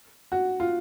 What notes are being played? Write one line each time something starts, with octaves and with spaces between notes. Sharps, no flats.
F#4
F4